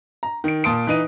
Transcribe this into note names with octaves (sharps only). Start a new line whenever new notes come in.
A#5
D#3 D7
A#2 A5 C6 D#6 D7
E3 D#4 D#7